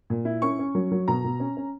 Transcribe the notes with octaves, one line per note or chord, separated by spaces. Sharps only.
A#2
E4
C#4 C#6
C#4
F#3
F#3
B2 A#5
B2
C#4
C#4